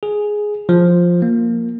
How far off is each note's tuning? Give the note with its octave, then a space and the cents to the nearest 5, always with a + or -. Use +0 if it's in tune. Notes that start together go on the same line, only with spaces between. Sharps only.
G#4 +5
F3 +5
A#3 -5